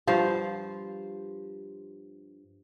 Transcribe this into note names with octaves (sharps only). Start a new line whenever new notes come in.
G2 F3 C5 F5